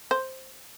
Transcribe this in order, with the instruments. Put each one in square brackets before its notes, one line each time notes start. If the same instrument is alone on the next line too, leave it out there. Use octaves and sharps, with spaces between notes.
[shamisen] C5